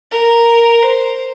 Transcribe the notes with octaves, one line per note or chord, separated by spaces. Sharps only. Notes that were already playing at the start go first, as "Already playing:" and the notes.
A#4
C5